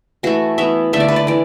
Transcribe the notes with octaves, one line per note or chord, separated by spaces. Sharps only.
E3 A3 F#4
E3 B3 E5
D3 A3 E5
D5
B4
D5
E3 D5